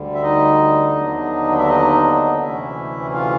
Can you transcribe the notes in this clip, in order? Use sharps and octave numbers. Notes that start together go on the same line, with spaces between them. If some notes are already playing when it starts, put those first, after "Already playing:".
Already playing: D2 D3 G3
E5
D#4 D#5
D#2 D3 F#3 B3 D4
E5
D#4 D#5
D2 C3 E3 A3 C#4 E4 E5
F4 F5